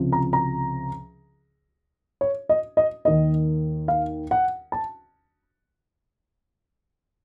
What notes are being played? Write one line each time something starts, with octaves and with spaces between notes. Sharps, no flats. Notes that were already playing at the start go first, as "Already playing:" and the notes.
Already playing: C#2 C3 F3
A#5
A#5
C#5
D#5
D#5
D#2 D#3 A#3 D#5
F5
F#5
A5